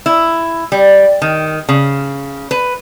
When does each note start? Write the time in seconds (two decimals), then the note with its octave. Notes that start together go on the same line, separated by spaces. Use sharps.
0.06 E4
0.72 G3
1.22 D#3
1.69 C#3
2.51 B4